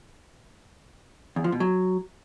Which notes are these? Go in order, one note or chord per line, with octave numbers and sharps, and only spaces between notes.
E2
F3
B2
F#3